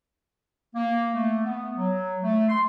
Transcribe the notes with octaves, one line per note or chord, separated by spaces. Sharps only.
A#3
A3
B3
F#3
A3
C6